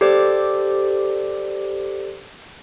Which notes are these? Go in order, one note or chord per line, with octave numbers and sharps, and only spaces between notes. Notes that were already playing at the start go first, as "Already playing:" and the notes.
G4 A4 C5 D5 D6